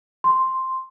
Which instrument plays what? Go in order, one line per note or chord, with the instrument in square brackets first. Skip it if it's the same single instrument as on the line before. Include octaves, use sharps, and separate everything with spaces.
[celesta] C6